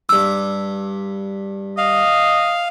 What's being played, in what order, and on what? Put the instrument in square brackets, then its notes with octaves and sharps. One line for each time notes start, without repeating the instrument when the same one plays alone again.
[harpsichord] G2 D6 [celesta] E6
[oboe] D#5 [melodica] F5